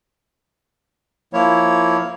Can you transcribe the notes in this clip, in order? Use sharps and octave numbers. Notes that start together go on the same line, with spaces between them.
F3 A#3 E4 C#5